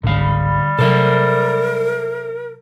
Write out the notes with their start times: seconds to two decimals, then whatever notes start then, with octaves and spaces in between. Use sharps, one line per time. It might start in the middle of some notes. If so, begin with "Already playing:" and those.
0.03 G1 C#2 G#2 D3 G3 F5
0.79 C3 F#3 A4 A#4 C5 E5